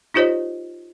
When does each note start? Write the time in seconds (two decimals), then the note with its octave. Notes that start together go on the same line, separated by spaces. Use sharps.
0.14 D#4 F4 G4 C5 C#5 D#5